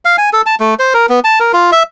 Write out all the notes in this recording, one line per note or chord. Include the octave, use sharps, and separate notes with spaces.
F5
G#5
A4
A5
A3
C5
A#4
B3
A5
A#4
F4
E5